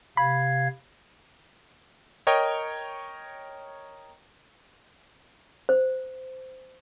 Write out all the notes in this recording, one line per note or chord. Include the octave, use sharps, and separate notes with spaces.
C3 F5 B5 G#6
A#4 C#5 D#5 G5
C5